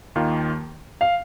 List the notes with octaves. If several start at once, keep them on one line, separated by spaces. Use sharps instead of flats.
D#2 D#3 A#3 F4
F5